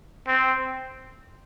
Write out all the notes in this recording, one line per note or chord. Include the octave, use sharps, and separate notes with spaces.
C4